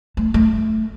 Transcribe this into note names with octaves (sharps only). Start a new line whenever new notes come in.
A3
A3